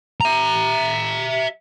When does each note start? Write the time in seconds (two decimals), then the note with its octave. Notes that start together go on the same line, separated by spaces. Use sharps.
0.20 E5 A#5